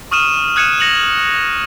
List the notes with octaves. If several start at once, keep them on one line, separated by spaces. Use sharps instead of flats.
C#6 D#6 F6 D#7 E7
D#6 F#6 G#6 C#7 D#7 E7
A#6 C#7 F7 F#7